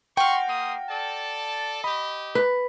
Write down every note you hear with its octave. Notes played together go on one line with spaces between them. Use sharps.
F#4 F5 G5 C6 C#6
A#3 C6 D#6
A4 D5 A5
G4 D#5 B5
B4